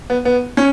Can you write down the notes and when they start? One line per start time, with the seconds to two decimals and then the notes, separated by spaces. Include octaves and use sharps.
0.10 B3
0.25 B3
0.57 C#4